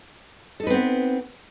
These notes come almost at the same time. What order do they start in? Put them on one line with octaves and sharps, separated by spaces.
A4 D#4 B4 C4 B3